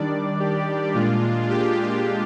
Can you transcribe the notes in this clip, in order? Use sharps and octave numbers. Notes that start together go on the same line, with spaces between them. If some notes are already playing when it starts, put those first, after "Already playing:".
Already playing: D#3 G3 D4 D5
G4
A#2 G#3 D4 F4
G4